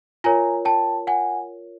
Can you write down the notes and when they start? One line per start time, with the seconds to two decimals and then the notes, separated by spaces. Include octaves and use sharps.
0.24 F4 A#4 C#5 G#5 A#5
0.65 G5 A5
1.07 F#5 G#5